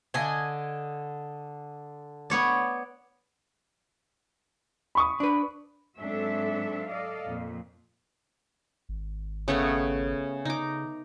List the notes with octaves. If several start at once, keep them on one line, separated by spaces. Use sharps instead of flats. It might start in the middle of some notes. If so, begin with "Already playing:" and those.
D3 D#5 G#5
B3 C#5 D5
B5 C#6 D#6
D4 B4
G#2 F#3 C4 D4 A4 E5
A4 D5 D#5 F5
F2 A#2
G#1
C#3 A3 B3
C#3 D#4 D6